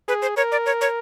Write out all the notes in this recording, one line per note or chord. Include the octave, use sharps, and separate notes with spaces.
G#4 B4
C5
A#4 C#5
D5
C#5
C#5